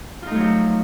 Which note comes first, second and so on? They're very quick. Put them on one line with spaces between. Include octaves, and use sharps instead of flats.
F4 D#4 A3 F#3 F3